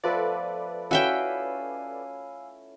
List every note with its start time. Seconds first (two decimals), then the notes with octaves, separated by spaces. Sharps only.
0.04 F3 A3 B3 A4 B4 D5
0.91 C#4 E4 F#4 E5 F5 G5 G#5 E6